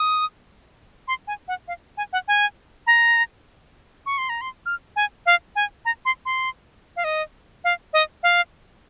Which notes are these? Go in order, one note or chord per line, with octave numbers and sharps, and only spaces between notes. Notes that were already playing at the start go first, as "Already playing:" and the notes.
Already playing: D#6
C6
G#5
F#5
F5
G#5
F#5
G#5
A#5
C#6
C6
A#5
C6
F6
G#5
F5
G#5
A#5
C6
C6
F5
D#5
F5
D#5
F5